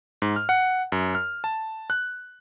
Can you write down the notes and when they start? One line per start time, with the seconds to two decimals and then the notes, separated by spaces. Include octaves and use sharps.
0.22 G#2
0.36 F6
0.49 F#5
0.92 F#2
1.15 F6
1.44 A5
1.90 F#6